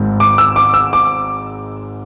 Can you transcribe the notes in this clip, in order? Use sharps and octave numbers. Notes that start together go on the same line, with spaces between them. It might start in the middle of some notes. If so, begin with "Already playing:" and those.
Already playing: G#1 G#2 G#3
D6
E6
D6
E6
D6